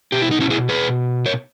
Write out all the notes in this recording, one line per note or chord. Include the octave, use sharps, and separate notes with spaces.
B2 G4
E4
D#4
C#4 E4
E4 G#4
G#4 B4
A#4 C#5